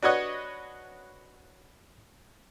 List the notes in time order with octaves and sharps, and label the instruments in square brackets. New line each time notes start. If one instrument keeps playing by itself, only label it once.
[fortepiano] D4 F#4 B4 C#5 D#5 F#5